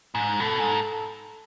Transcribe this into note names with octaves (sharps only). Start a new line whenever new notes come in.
G#2
B2 A4
G#2